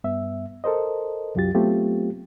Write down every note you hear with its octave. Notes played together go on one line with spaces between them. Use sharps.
G2 B3 E5
A4 A#4 C5 D#5
C2 F#2 F#3 F4 G4 A6
F#3 A3 B3 C4 F4 G4